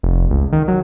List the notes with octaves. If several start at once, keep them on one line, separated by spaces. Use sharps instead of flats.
F1
C#2
D#3
F#3